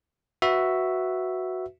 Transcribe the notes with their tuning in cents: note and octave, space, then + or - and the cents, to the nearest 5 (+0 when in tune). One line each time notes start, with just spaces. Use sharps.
F#4 +0 B4 +0 E5 +0